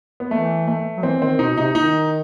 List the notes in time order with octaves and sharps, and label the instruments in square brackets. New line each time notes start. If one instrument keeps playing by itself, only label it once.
[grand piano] B3
[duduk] E3 [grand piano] A3
[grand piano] A3
[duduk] F#3
[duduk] E3 [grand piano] C4
[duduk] D#3 [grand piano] C4
[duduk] B2 [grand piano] D#4
[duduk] C3 [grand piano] D#4
[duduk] D#3 [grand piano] D#4